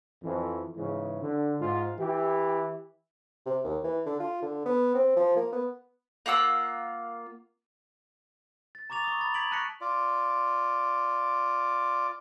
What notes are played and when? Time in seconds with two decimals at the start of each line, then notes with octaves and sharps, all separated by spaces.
0.23 F2 E3
0.76 G#2 C#3 E3
1.22 D3
1.61 G#2 F4
1.99 E3 E4 G4
3.46 C3
3.64 D#2
3.84 E3
4.06 D3
4.20 F4
4.42 D3
4.66 B3
4.95 C4
5.16 F3
5.36 A#3
5.52 B3
6.26 A#3 F4 F#5 E6
8.75 A6
8.90 A#5 C#6 D6 A6 F7
9.04 C#6 D#6
9.19 B5 A6
9.34 G#6 B6 D7 F#7
9.51 A5 C#6 F#6 A#6 B6 C#7
9.81 F4 D5